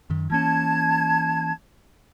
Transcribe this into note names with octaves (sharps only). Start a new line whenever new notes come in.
F#2 D#3
E3 A#3 C#4 A5 G#6